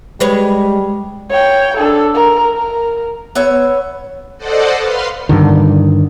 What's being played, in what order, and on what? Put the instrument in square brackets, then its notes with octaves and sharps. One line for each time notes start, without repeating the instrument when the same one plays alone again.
[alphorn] G3 [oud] G#3 B4 C#5
[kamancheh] C#5 G5
D4 A4
A#4
A#4
[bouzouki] B3 C#5 E5
[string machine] A4 C5 D5 D#5 F#5
B4 F5 C6
[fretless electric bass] G2 D3 D#3